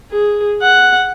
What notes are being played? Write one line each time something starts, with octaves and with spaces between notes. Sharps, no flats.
G#4
F#5